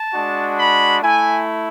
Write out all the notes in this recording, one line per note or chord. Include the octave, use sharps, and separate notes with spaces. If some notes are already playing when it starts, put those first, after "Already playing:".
Already playing: A5
G#3 D4 F#4
B5
A3 E4 G#5